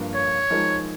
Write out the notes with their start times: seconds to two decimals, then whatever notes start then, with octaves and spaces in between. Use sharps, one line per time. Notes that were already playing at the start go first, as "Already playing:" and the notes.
Already playing: G2 F3 A#3
0.14 C#5
0.50 F3 G#3 D#4 A#4